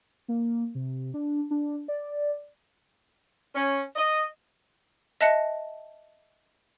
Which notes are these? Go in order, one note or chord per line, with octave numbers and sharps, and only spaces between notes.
A#3
C3
D4
D4
D5
C#4
D#5
D#5 E5 A5 F#6 A#6 C#7